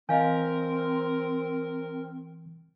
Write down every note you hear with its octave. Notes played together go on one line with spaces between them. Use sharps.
E3 C4 A#4 D#5 F5 G#5 G6